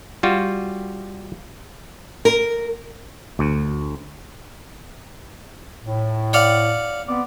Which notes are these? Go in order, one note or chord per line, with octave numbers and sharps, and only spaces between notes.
G3 F4 F#4
A#4
D2
A2
D5 F5 F#5
B3 C4 D5